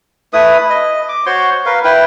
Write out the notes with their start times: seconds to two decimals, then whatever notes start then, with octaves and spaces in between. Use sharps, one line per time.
0.33 A3 E4 B4 D#6
0.70 D#5
1.09 D6
1.26 F#4 C5 C#5 C6
1.66 A#4 B4 F5
1.84 E4 B4 G5